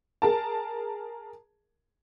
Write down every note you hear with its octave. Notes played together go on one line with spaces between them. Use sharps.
G#4 A#4 A5